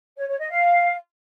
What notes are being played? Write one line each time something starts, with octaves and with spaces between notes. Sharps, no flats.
C#5
C#5
D#5
F5